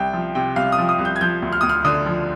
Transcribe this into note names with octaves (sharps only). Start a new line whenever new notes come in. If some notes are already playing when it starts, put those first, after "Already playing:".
Already playing: C2 G5
F3
C3 G5
C2 F5
D#6
F3
D#6
C2
G6
G#6
F3 G6
D2
F6
D2 D#6
F6
D3 D#6
F3